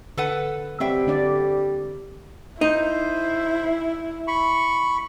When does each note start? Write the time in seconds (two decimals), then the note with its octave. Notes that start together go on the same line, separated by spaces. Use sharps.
0.18 D3 A4 B4 F#5
0.80 F#3 G3 C4 E5 G5
1.07 D3 D4 D5
2.61 D#4 E4 C5
4.27 B5 C#6